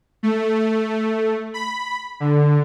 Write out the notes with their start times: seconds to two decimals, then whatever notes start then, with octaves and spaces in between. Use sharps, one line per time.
0.23 A3
1.54 B5
2.20 D3